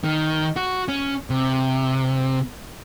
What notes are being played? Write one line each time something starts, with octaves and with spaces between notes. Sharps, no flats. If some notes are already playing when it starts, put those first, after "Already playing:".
D#3
F#4
C#4
C3